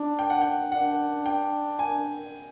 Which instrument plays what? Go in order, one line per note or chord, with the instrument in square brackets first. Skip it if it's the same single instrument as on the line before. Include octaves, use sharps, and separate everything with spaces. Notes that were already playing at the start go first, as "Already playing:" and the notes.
Already playing: [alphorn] D4
[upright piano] G5
F#5
G5
[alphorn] D4 [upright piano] F#5
[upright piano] G5
G#5